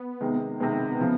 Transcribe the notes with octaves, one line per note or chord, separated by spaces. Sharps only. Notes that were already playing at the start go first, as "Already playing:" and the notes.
Already playing: B3
C3 D#3 G#3
C3 D#3 G#3 B3
C#3 F3